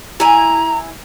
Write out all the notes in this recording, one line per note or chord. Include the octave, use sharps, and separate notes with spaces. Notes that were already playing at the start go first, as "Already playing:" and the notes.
E4 G#5 A#5